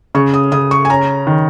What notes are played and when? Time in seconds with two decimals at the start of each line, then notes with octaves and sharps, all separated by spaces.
0.15 C#3 C#6
0.34 D#6
0.52 C#3 D#6
0.71 C#6
0.85 G#5
0.90 C#4 A#5
1.27 D#3